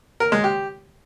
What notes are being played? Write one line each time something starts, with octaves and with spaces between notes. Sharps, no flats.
A#4
G#3
G4